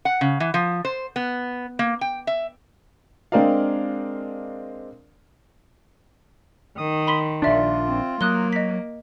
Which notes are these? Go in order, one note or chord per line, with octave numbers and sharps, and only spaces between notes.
F#5
C#3
E3
F3
C5
B3
A#3
G5
E5
G#3 C4 D4 A#4 D5 F5
D#3 D#6
B5 C6 B6
A#1 D4 F4 D5 E5
C4
F#3 A#3 D#6 F#6 G7
D#5 B6